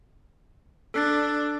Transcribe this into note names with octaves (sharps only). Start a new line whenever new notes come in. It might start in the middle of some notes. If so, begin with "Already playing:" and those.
D4 A4 F#6 A6